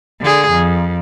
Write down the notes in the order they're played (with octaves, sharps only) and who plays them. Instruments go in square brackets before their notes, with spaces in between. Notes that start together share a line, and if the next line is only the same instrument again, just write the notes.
[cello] D3 G#4
F2